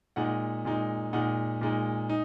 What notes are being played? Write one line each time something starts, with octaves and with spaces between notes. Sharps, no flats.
A#2 G#3 D#4 F#5
A#2 G#3 D#4
A#2 G#3 D#4 F#5
A#2 G#3 D#4
D#4